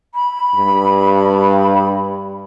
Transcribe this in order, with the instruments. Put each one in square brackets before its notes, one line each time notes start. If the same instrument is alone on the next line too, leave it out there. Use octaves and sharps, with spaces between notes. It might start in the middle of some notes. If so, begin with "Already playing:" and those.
[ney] B5
[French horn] G2